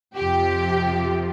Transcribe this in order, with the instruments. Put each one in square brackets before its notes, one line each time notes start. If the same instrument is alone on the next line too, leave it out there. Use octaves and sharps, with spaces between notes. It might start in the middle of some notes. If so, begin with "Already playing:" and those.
[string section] F2 C3 F3 G4